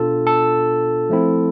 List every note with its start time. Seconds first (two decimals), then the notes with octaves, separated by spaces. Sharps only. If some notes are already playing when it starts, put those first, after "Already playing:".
Already playing: B2 B3 D4 F4 A4
0.27 A4
1.10 F3 A3 C4 E4